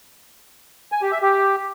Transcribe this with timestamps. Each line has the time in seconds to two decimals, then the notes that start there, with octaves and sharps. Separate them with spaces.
0.92 G#5
1.02 G4
1.12 E5
1.22 G4